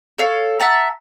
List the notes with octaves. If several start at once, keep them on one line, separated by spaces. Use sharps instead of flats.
A4 C#5 F5
E5 F#5 A5 A#5